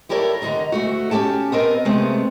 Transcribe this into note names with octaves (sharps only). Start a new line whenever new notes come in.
E4 G4 A4 A#4 C#5 D5
D#2 D3 F3 D#5 A#5
D2 A3 F#4
C#4 E4 G4 G5 A5
B3 C4 A#4 D#5
C3 G#3 A3 B3 C4